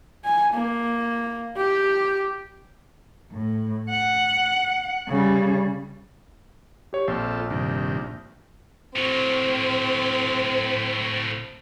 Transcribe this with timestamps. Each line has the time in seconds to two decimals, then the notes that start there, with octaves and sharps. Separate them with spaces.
0.25 G#5
0.54 A#3
1.57 G4
3.32 A2
3.90 F#5
5.08 C#3 G3
6.93 G4 C#5
7.08 A#1 C4 F4 A4
7.50 G2 C3 D#3
8.96 A2 F#3 C4